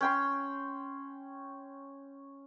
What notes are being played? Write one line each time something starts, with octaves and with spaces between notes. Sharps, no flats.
C#4 G5 C6